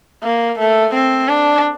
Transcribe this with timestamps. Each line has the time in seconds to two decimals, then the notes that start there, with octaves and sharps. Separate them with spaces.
0.23 A#3
0.59 A3
0.94 C4
1.28 D4